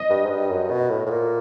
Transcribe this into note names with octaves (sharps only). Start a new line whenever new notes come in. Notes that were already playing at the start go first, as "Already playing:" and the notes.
Already playing: D#5
G2
G#2
G2
F#2
B2
A2
A2
A#2